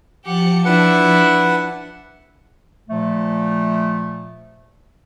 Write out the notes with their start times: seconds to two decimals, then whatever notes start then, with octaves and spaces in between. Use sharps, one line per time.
0.25 F3 G4 F#5 A5 C#7
0.65 D4 E4 B4 F#5
2.89 A#2 F3 A3